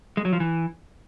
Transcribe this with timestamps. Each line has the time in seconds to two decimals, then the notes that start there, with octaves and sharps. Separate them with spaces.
0.17 G#3
0.25 F#3
0.33 F3
0.40 E3